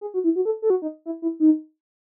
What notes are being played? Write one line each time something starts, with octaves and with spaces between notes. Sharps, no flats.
G#4
F#4
E4
F#4
A4
A4
F#4
D#4
E4
E4
D#4